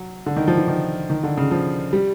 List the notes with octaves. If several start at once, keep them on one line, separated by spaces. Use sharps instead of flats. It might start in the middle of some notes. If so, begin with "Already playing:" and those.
Already playing: F#3
D3
D#3
F3
E3
D#3
D#3
D3
C#3
F3
G3